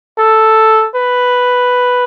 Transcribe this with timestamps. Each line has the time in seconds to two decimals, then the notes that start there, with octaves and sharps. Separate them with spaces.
0.18 A4
0.95 B4